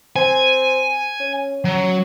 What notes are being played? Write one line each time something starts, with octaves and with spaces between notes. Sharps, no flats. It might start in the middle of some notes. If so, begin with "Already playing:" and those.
C4 G#5
C#4
F#3 C#4